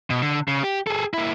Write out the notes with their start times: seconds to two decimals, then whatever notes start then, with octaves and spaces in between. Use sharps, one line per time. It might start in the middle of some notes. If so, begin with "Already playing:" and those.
0.10 B2
0.22 D3
0.48 C#3
0.64 G4
0.87 G#4 A4
1.14 A#3 E4